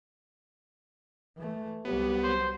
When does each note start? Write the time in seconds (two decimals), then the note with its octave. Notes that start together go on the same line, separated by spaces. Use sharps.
1.36 E3 A3
1.85 C2 F#3 B3 G4
2.23 F#3 C5